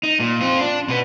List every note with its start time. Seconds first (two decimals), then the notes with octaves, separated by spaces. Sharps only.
0.03 D#4
0.20 A#2
0.41 C4 F4
0.60 D4
0.88 B2 B3